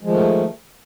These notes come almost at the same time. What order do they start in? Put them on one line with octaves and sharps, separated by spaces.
G#3 F3 D#3 A3